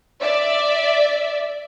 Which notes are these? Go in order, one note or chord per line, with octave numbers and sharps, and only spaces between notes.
D5 E5